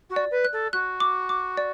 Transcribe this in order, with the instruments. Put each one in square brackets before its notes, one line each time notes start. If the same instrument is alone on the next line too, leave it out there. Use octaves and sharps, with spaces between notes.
[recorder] F#4
[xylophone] D5
[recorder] B4
[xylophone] F#6
[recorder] A4
[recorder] F#4 [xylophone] F#6
[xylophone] D6
D6
D5